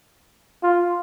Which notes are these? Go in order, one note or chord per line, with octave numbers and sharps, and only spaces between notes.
F4